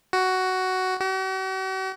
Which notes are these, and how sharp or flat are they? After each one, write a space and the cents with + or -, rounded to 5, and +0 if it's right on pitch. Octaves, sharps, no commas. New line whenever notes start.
F#4 +10
F#4 +45